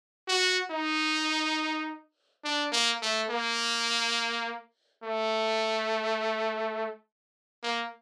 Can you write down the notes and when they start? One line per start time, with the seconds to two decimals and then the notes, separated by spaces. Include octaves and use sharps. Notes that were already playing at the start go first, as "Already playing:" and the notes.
0.28 F#4
0.71 D#4
2.45 D4
2.72 A#3
3.02 A3
3.30 A#3
5.04 A3
7.64 A#3